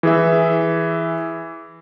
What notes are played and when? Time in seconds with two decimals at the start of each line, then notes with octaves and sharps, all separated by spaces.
0.03 E3 G#4 E5